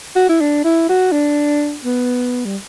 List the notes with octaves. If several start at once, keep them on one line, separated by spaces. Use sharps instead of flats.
F#4
E4
D4
E4
F#4
D4
B3
G3